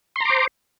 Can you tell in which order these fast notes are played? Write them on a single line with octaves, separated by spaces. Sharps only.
C6 A#5 D6 C5